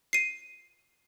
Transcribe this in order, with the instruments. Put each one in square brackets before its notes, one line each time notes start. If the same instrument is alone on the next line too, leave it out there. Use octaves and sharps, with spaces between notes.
[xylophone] C7 D#7